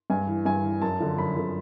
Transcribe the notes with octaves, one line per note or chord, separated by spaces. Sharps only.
G2 G#5
E3
G2 G#5
E3
F#2 A5
D3 F3
F#2 B5
D3 F3